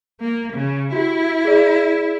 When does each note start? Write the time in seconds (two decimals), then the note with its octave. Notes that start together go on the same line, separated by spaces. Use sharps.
0.20 A#3
0.53 C#3
0.93 E4 F#4 G4
1.45 G#4 D5